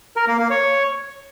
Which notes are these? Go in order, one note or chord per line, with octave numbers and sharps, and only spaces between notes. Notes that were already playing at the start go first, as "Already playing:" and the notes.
A#4
A#3
A#3
C#5